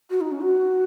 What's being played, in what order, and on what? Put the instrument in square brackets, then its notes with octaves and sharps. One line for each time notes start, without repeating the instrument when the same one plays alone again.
[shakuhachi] F#4
D#4
C#4
F#4